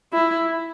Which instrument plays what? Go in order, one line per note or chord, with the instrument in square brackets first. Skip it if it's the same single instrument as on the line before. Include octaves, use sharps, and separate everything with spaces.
[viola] E4